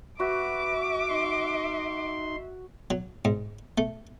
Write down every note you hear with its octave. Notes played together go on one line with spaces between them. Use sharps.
F#4 B4 E5 D6
D#4 C6
F#3
G#2
A3